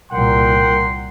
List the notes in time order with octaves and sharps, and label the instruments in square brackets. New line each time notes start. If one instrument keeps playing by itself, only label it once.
[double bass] C2 A#2 [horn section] A#4 F#5 G5 [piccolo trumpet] C6